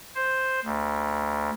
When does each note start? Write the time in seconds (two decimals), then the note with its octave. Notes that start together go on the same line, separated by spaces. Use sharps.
0.15 C5
0.64 D2